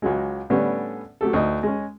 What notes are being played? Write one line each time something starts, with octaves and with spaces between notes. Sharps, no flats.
C#2 F#3 G#3
A2 D3 G3 B3 C#4
F#3 A3 G4 A4
D2 A2 D#4 D#5
G#3 C#4